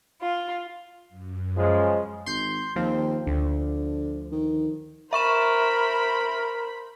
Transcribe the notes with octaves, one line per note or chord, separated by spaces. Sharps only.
F4
F#2
C#3 F3 G#3
G#1 C6 G6
D#2 F3 C4
D2 D3
D#3
A#4 C5 E5 B5 C#6 E7